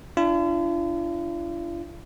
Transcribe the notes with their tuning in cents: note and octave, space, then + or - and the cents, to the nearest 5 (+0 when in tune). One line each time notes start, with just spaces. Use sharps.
D4 +0 F4 -45